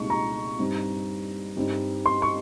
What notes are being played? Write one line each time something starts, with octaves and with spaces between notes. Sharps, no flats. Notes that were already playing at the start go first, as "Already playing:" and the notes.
Already playing: C2 A#2 G#3 D#4 C#6
A#5
G2 G3 C4 D#4
G2 G3 C4 D#4
C6
C#6